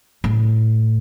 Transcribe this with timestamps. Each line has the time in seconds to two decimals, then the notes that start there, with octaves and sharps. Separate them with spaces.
0.24 A2